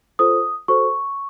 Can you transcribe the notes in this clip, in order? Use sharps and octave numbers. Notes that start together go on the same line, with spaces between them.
F4 A4 C5 D#6
F#4 A4 C5 C#6